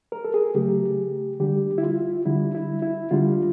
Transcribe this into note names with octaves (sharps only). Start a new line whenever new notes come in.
A#4
A4
G#4
C#3 F#3 A3 G4
D3 G3 G4
E4
F4
D3 G3 E4
E4
E4
D3 G3 F4